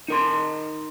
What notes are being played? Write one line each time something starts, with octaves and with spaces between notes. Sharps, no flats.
D#4 A#4 C6